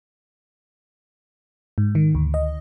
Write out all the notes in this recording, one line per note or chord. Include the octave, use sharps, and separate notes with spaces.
G#2
D#3
D2
D#5